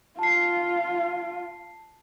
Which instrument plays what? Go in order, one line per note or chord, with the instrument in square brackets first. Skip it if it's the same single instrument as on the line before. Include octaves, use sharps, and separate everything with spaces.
[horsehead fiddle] F4 [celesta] A5 C7